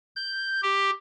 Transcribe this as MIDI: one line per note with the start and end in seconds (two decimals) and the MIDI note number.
0.16 0.61 91
0.63 0.91 67